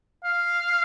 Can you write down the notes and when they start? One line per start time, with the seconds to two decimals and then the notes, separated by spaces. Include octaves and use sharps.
0.24 F5